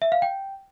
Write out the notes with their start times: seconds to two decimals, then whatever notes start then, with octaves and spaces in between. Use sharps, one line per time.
0.02 E5
0.12 F5
0.22 G5